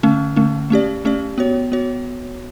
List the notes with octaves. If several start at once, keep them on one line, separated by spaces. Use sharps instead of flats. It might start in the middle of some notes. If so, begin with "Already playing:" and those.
D3 A3 C#4
D3 A3 C#4
A3 C#4 G4 D5
A3 C#4 G4 D5
B3 F#4 C#5
B3 F#4 C#5